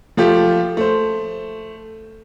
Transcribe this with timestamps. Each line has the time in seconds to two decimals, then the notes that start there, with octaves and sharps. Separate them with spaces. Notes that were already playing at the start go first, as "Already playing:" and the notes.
0.17 F3 A3 F4 G4
0.77 A3 C5